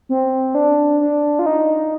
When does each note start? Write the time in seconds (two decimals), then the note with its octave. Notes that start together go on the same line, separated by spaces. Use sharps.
0.09 C4
0.55 D4
1.01 D4
1.39 F4
1.46 D#4